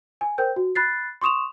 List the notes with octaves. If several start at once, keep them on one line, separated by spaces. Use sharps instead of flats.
G#5
A#4 C5 G5 G6
F#4
B5 F#6 A6 C7
C6 C#6 D#6 E7 F7